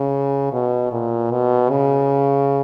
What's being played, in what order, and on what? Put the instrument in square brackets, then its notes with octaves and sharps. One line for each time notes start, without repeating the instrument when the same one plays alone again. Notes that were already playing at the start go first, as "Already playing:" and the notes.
Already playing: [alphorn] C#3
B2
A#2
B2
C#3